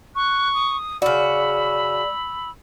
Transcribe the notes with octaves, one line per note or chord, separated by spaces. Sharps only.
C#6 F#6
D#6
C#3 F#4 D5 B5 E6